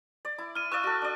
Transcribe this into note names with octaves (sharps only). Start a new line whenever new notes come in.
D5
E4
E4 F6 D#7
D5 F5 C#6 E6 F#6
F#4 A4
D4 D5